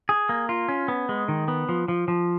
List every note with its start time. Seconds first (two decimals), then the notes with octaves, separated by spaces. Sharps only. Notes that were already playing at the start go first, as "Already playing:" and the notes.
0.09 G#4
0.29 A#3
0.49 F4
0.69 C#4
0.88 B3
1.09 G#3
1.28 D#3
1.48 B3
1.69 F3
1.88 F3
2.08 F3